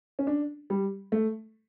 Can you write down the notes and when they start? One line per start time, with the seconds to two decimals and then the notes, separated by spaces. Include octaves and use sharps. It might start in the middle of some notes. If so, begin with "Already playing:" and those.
0.19 C#4
0.27 D4
0.70 G3
1.12 A3